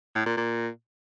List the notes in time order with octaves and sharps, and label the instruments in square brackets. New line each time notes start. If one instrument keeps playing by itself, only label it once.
[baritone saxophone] A2
A#2
A#2